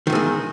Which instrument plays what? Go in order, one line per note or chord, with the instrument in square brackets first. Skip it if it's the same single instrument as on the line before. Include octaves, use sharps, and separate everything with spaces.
[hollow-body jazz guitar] D#3
G#2
E2
G#3